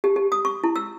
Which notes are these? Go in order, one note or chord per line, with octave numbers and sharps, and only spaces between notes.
G4
G4
D#6
C#6
E4
E6